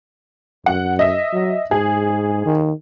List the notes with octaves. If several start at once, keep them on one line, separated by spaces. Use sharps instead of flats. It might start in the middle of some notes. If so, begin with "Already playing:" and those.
F#2 F#5
D#5 E5
F#3
G#2 G#4
D#3